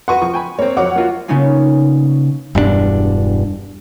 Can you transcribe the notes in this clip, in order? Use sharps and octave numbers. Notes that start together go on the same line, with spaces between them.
F#4 B4 F#5 C6 C#6 D#7
F3 C#6
G5 G#5 B5
A#3 C4 C#5
F2 F#3 C#5 F#5 D6
A#3 F4 F#4
C#3 A#3 B3 C#4 D#4 F4
E1 G2 C4 D4